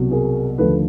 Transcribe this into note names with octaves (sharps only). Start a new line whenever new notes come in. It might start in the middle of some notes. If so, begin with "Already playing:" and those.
Already playing: C2 B2 F#3
G#4 A#4
D#2 D3 F3 A3 A4 B4